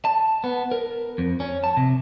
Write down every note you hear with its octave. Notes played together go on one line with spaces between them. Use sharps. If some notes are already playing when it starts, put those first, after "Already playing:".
A5
B3
A#4
F2
C#4
A5
C3